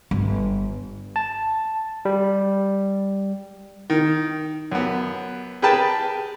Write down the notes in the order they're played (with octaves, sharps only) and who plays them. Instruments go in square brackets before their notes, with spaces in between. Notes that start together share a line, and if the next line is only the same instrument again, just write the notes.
[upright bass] G1
[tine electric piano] A5
G3
[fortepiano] D#3
F#2 B3
G4 G#4 A#4 B4 G5 A5